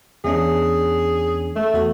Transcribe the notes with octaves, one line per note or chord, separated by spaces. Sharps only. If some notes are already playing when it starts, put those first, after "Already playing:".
E2 C#4 D4 G#4
A3
E2 F#4 A4